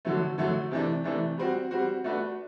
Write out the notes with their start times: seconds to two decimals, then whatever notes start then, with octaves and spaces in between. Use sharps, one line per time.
0.05 D3 F#3 A3
0.38 D3 F#3 A3
0.71 C3 E3 A3 D4
1.04 C3 E3 A3 D4
1.38 G3 C4 F#4
1.71 G3 C4 F#4
2.04 A3 D4 F#4 B4